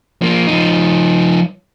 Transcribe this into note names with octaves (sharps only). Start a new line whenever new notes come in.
F3 A#3
F3 D#4